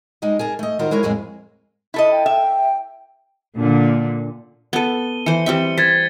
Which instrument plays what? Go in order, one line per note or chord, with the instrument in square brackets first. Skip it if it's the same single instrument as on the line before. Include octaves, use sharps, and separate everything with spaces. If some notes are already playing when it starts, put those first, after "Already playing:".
[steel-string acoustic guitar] G3 G#3 D#4 D#5
G#4 A#4 A5
A3 D#5
D#3 G3 F4 F#4 A#4 C5
G#3 E4 A#4 C#5 D#5
F2 A2 G#3 A#3 G#5
[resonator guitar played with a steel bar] E4 A4 D#5
[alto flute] G5
[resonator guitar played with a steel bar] E5
[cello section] A#2 D3
[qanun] B3 A4 [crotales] D#7 G7
[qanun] E3 C5 [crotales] C#7 G7
[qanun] G3 C4 E5 [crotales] G7
[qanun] C5 [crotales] G#6 A6 B6